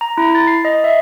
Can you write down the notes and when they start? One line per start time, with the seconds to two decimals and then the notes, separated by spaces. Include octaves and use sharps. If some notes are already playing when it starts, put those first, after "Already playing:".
0.01 A#5
0.18 E4
0.35 A6
0.47 C7
0.65 D#5
0.84 E5